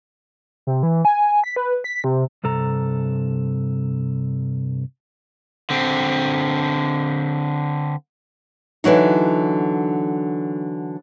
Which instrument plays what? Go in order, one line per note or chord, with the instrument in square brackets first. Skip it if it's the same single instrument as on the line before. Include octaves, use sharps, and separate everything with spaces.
[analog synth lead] C3
E3
G#5
B6
B4
B6
C3
[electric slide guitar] G2 C3 A4 A#5
[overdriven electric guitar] D3 C4
[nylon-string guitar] D3 E3 F#3 D#4